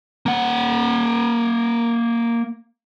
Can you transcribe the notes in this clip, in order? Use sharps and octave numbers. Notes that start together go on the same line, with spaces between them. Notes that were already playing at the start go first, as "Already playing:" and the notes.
A#3 F#5